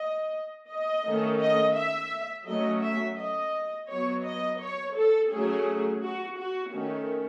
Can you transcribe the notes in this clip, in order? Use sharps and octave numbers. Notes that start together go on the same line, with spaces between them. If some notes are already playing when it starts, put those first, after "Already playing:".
Already playing: D#5
D#5
D#3 A3 C#4
D#5
E5
F#3 A3 C#4 D#5
E5
D#5
F#3 B3 C#5
D#5
C#5
A4
F#3 A3 C#4 G#4
F#4
F#4
D#3 A3 C#4